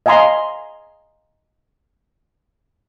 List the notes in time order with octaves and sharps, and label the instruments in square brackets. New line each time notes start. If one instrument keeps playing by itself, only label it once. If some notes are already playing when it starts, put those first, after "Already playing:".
[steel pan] D#5 F5 G#5 A#5 C6